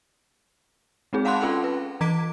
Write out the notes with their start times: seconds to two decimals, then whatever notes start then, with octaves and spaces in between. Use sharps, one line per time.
1.13 G#3 C4 D#4 G#4
1.25 F5 F#5 A5 B5 C6 F#6
1.41 C#4 F4 A4 F#5 G5
1.64 B4
2.01 E3 A#5 D6 G#6 B6 D7